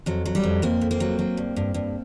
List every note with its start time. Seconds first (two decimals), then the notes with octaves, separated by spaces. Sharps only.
0.06 F2 F#3
0.26 F#3
0.35 G3
0.43 F2
0.62 F2 A#3 C4
0.81 F2
0.91 A#3 C4
1.00 F#3
1.19 F#3
1.37 G2
1.56 G2
1.74 G2